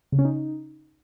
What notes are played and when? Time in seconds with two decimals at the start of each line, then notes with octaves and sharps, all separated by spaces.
0.12 C#3
0.19 C#4
0.25 D#4